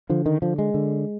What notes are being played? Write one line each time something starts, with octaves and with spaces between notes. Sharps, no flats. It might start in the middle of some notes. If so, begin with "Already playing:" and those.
D3 F3
D#3
D3 F3
G#3
D3